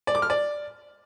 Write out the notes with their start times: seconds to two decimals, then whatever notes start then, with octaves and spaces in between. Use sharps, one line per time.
0.07 D5
0.15 D6
0.22 F6
0.30 D5